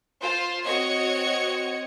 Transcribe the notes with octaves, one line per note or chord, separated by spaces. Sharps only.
F4 C5
C4 F#4 C#5 D#5 G#6 C#7